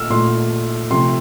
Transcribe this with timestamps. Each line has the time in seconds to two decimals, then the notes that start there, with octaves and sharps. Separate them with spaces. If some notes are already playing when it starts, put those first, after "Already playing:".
Already playing: A#2 A3 E6 F6
0.10 A#2 A3 C6
0.91 C3 F3 A3 C6